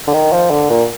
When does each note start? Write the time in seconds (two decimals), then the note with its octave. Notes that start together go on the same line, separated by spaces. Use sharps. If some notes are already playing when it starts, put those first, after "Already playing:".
0.08 D3
0.14 D#3
0.33 F3
0.50 D3
0.70 A#2